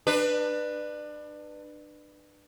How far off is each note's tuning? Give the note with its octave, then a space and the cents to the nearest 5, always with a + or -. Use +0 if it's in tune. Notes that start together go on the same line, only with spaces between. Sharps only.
D4 +30 B4 +0